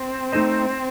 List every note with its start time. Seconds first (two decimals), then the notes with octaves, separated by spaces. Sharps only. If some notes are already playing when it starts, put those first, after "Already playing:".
Already playing: C4
0.32 A3 D#4 A4 C5 D#5